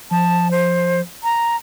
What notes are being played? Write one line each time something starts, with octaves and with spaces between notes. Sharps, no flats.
F3 A5
C5
A#5